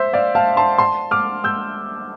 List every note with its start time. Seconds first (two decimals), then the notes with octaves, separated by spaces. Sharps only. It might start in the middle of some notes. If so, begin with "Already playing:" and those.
Already playing: C5 E5
0.13 D5 F5
0.35 F5 A5
0.57 A5 C6
0.78 A5 C6
1.11 D6 F6
1.44 E6 G6